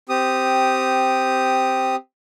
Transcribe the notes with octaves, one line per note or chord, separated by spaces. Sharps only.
C4 G4 D#6